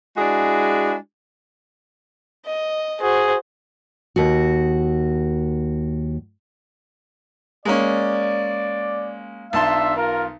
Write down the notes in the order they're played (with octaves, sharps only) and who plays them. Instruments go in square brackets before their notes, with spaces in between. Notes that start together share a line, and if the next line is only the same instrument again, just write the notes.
[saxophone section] G#3 D4 E4 F#4 G#4
[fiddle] D#5
[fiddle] F#4 C5 [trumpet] G#4
[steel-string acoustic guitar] D#2 F#4
[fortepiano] G#3 A#3 C#4 [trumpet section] D5
[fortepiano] B1 A5 C6 [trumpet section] D4 F4 E5
[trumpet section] F4 A#4